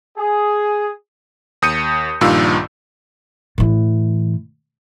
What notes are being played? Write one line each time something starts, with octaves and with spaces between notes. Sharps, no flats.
G#4
D#2 D#6 G6 C#7 D#7
A#1 G2 A#2 D#3 F4 E6
A2 E3